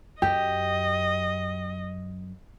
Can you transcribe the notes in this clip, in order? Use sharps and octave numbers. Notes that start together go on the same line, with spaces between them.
F#2 G4 D#5